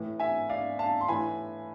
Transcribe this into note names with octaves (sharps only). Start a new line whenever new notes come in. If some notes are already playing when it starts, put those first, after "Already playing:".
Already playing: A2 E3
E5 G#5
D5 F5
F5 A5
C6
A2 E3 G#5 B5